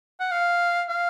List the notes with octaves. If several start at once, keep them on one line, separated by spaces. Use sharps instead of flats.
F#5
F5
F5